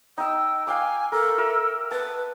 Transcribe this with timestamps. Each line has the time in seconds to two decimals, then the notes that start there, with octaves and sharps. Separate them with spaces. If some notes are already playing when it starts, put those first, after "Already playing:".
0.18 D#4 G5 E6
0.67 F5 G5 G#5 D6
1.12 A4 A#4
1.38 A#4 E5 E6
1.91 B4 A5